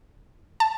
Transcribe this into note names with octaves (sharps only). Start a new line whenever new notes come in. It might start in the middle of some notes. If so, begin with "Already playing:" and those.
A5